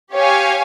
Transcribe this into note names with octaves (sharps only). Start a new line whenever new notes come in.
G4 C#5 F5 G#5